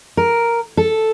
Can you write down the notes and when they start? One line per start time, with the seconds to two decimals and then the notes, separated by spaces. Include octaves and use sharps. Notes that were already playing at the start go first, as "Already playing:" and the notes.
0.17 A#4
0.77 A4